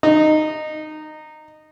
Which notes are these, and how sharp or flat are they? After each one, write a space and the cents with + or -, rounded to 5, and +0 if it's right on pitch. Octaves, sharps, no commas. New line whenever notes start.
D#4 -15